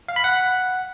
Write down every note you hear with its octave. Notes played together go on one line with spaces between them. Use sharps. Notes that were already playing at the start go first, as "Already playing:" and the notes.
F5
B5
F#5